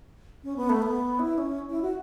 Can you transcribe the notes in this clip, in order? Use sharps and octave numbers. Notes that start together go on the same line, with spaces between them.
C#4
B3
A3
B3
E4
C#4
E4
F#4